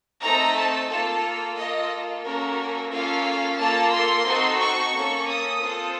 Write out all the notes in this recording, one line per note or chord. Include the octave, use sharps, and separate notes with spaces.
A3 C4 D#4 A4 A#5
A5
A#3 F4 A4 A5
A#3 F4 A4 D#5
A#3 C#4 F#4 A4 A#4
A#3 C#4 F4 A4 F5
A#3 F4 A4 A5
C6
C4 D#4 F#4 A4
C#6
A#3 C#4 A4
D#6
C4 F4 A4